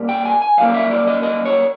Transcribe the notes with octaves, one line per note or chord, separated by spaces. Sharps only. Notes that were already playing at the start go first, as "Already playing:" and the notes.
Already playing: A#2 G3 A#3
G5
G#5
G#5
F#2 D#3 G3 A#3 F5
E5
D5
D#5
D#5
C#5